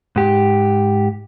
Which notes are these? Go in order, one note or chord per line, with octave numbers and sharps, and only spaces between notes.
G#2 G4